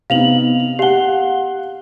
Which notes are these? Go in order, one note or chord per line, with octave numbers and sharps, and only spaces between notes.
C3 B3 D#4 F5 F7 F#7
G4 F5 F#5 G7